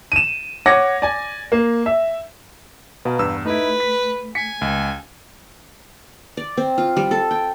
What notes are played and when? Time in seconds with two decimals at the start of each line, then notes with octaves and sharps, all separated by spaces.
0.12 D#7 E7
0.66 C#5 F#5 D6 A#6
1.02 D5 G#5
1.52 A#3
1.86 E5
3.05 B2 B4 F5 A#5
3.19 E2 G2 E6
3.45 A3 D#4 E4 B4
3.80 B6
4.35 G#5 B6 C#7
4.61 C#2
6.37 D5
6.57 C4
6.78 F4
6.97 G3
7.11 A4
7.31 G5